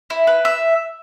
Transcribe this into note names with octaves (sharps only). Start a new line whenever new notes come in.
E4
B4
E5